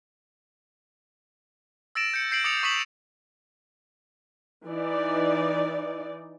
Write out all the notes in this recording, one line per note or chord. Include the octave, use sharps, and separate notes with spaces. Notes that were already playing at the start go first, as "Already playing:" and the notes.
E6 A6 A#6 D7 E7
G6 C#7
G6 C7 D7 F#7
D6 D#6 A6 C#7 F7
C#6 D#6 G6 B6 E7 F#7
E3 D#4 D5